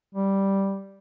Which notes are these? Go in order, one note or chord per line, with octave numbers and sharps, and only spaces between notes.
G3